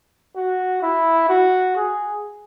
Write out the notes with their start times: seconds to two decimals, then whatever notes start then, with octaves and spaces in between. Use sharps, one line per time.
0.37 F#4
0.83 E4
1.29 F#4
1.76 G#4